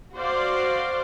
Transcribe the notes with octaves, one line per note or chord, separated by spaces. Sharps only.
F#4 C5 D5 F5